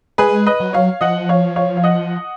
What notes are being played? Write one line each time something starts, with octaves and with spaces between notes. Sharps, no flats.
G#3 G#4 B4
B4 D#5
F#3
C#5 F5
F3 D#5 F#5
C#5 F5
C#5 F5
F5
D#5 F#5